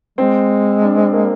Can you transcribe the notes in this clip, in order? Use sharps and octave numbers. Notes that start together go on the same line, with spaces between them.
G#3 C4
D4
C4
A#3